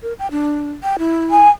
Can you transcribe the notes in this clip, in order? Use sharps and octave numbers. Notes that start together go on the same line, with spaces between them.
A#4
G5
D4
G5
E4
G#5